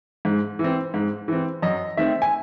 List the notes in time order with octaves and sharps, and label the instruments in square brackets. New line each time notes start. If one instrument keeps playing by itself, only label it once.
[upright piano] G#2
E3
C4
G#2
E3 C4
F#2 D#5
D#3 A3 C4 E5
G#5